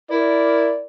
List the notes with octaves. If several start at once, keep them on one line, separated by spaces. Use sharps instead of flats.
E4 A#4 D5